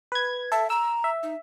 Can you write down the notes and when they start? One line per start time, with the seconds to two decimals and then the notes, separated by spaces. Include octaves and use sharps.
0.12 B4 G#6
0.52 A4 E5
0.70 A#5 E6
1.04 E5
1.23 D#4